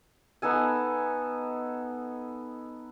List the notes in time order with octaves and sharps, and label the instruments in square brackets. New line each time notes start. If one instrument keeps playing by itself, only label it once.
[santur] B3 D#4 A4 G#5